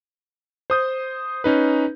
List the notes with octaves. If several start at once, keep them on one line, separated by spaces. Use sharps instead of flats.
C5 D#6 G6
C#4 D#4 B4